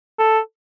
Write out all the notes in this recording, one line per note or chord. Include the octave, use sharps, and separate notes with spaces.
A4